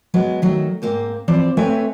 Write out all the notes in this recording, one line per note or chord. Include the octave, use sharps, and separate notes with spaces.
F#3 G#3 B3
D#3 F#3 A3
G#2 A#3 C4
E3 F3 C4 C5 D5
A3 C4 B4 C#5 E5 G#5